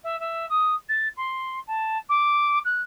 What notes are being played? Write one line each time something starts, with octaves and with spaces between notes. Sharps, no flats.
E5
E5
D#6
A6
C6
A5
D6
F#6